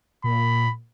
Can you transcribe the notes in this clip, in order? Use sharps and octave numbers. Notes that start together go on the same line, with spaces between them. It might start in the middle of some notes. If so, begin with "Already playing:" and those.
A#2 B5